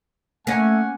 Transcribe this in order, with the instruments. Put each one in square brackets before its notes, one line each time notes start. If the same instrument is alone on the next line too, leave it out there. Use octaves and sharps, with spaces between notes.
[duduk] A3 [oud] A#3 C#4 [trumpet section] F#5 G#5